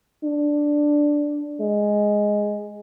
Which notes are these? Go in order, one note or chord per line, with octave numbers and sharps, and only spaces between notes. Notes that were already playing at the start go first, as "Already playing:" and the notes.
D4
G#3